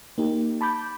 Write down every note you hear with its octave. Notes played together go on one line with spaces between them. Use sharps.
A#3 D#4 G4
A5 B5 D6 G6